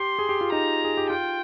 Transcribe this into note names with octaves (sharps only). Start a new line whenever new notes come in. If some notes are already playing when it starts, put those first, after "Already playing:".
Already playing: G4 C6
G#4
G4
F4
D#4 A#5
G#4
G4
F4 G5